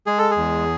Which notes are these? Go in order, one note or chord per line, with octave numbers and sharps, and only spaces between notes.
G#3 G#4
A4
G#4
E2